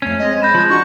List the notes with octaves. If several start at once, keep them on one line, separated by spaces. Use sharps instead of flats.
F2 A3 C#4 C7
G#3 C4 D#5
B5 G6 A#6 E7
F3 G#3
D4 F#4 C#6